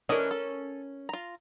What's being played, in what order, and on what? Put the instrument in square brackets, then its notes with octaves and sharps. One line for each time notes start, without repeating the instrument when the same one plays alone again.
[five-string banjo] E3 D4 D#5 [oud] C#4 A#4
[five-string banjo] A4
F4 A#5